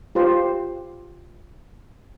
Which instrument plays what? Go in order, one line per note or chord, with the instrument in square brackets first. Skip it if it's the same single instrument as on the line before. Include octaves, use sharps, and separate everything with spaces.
[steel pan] F4 G4 C5